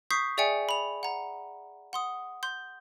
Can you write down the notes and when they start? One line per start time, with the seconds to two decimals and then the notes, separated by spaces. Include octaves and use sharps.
0.11 C#6 D#6 G6 B6 C7
0.38 G#4 D5 E5 G5 G#5 C#7
0.69 B5 F7
1.03 F#5 A#5
1.93 F#5 C6 D#6
2.43 C6 G6